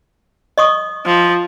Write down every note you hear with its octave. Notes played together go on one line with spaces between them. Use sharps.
D#5 C#6 D#6
F3